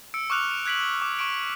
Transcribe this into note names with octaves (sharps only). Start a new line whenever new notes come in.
E6 C#7 D7
C#6 D6 F6 F#6 C#7 F7
F7
F#6 G#6 B6 D7 F#7
D6
C#6 D7